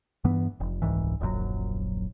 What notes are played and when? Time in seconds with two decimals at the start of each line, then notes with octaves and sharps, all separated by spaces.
0.24 G2 E3 B3
0.60 F1
0.82 D#1 C2 G#2 E3
1.20 D#1 A#1 F#2 F#3